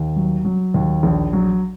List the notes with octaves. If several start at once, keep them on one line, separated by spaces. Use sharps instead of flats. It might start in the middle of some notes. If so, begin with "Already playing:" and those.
Already playing: D#2
F#3
F#3
D#2
A#1
F#3